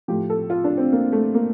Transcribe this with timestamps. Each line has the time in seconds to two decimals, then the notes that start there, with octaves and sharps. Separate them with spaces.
0.08 A2 F3 G4
0.30 A4
0.50 F4
0.64 D4
0.77 C4
0.92 A#3
1.12 A3
1.34 A#3